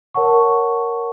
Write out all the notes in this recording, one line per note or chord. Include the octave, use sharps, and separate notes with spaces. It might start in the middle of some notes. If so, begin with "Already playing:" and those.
A#4 C#5 F#5 A5 C#6